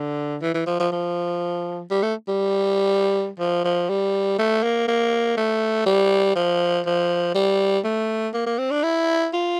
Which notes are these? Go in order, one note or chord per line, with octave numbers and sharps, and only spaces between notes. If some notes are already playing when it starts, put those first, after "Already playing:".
Already playing: D3
E3
E3
F3
F3
F3
G3
A3
G3
F3
F3
G3
A3
A#3
A#3
A3
G3
F3
F3
G3
A3
A#3
A#3
C4
D4
E4
F4